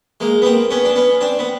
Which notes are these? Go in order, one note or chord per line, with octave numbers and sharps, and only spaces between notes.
G#3 A#3
B3
A#3 C4
B3 C#4
D4
B3 C#4
C4 D4
B3